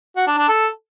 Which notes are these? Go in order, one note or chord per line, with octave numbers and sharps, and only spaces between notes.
F#4
D4
D4
A4